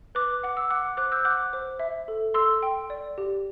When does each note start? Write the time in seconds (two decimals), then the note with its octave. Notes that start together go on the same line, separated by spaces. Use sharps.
0.15 B4 D6 F#6
0.43 F#5 D6
0.57 E6
0.70 F#5 D6 F#6
0.97 C5 D6 F#6
1.12 E6 G6
1.25 F#5 D6 F#6
1.53 C5
1.79 E5
2.08 A4
2.34 A4 C6 E6
2.63 G5
2.90 D5
3.18 G4